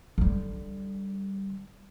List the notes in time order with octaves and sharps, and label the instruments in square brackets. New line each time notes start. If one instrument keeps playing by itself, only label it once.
[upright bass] D3 G3